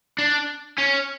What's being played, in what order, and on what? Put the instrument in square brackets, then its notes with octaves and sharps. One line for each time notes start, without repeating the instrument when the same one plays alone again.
[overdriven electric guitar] D4
C#4